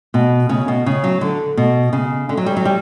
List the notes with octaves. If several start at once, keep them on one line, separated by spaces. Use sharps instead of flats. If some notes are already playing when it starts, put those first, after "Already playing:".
B2
C#3
B2
C#3
F#3
D3
B2
C#3
D3
F#3
G3
F#3
G3